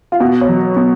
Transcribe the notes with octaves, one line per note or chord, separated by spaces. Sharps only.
F4
B2 F#4
C#5
F#3
B2